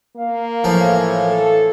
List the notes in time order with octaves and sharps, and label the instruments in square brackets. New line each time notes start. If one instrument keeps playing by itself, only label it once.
[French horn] A#3 [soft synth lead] F5
[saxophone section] A2 E3 C#5 [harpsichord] F3
[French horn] A4